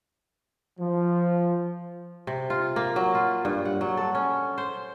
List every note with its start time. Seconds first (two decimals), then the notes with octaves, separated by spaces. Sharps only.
0.80 F3
2.27 C3
2.50 F4
2.76 A#3
2.96 F#3
3.15 F4
3.45 G2
3.65 F#5
3.81 F#3
3.97 A4
4.15 C#4
4.58 C5